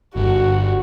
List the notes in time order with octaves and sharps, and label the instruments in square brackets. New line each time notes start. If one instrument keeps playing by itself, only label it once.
[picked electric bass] G1 [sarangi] F#4